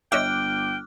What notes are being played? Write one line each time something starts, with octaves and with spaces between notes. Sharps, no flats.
G1 C#5 D#5 E5 G5 D6 F6 F#6